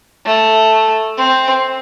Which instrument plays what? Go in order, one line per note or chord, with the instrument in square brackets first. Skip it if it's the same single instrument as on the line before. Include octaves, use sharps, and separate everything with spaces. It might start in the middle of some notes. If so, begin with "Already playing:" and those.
[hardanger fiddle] A3
C4